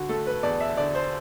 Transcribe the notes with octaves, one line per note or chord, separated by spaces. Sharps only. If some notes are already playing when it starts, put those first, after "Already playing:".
Already playing: D3 F#4
A3 A4
B4
E2 D5
E5
D3 D5
C5